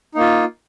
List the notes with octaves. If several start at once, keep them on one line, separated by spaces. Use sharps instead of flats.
A#3 D#4 F4